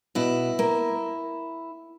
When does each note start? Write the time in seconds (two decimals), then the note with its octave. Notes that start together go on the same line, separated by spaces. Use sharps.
0.15 B2 E4
0.59 A#3